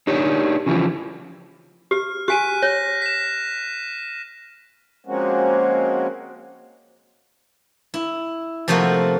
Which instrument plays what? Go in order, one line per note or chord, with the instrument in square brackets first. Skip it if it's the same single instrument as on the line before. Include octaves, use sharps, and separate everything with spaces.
[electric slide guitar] D4 D#4 G4 C#5
C#3 E3 F3
[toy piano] G4 [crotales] F6
[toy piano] G4 G#5 [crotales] F#6 B6 D#7
[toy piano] C#5 [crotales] A#6
[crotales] B6 E7
[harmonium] F3 G#3 A#3 C4 C#4 F#4
[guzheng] E4
C3 F3 A3 A#3 F4 F#4